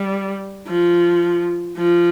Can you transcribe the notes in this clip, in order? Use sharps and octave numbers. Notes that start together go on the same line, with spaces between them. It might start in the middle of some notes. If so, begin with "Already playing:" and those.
Already playing: G3
F3
F3